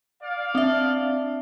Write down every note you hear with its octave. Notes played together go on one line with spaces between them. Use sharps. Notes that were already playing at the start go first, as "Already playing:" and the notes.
D5 F5
C4 D4 E5